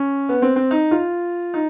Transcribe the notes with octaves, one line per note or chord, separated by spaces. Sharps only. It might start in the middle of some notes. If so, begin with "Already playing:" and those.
Already playing: C#4
B3
C4
C4
D#4
F4
D#4